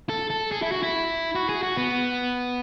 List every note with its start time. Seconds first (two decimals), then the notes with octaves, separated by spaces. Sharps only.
0.09 A4
0.30 A4
0.52 G#4
0.62 E4
0.72 F#4
0.83 E4
1.35 F#4
1.49 G#4
1.63 F#4
1.77 B3